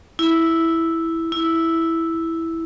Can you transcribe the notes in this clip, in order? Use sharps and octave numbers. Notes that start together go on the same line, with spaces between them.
E4
E4